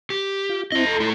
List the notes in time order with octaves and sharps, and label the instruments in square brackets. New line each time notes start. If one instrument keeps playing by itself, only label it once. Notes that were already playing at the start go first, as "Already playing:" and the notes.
[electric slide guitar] G4
[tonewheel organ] F4
[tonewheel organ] C4 E4 [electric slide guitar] F4 D#5
[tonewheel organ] A4 A#5 C6
[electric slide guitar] A3 E4